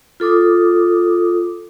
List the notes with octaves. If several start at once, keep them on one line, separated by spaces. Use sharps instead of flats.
F4 A4 D6 D#6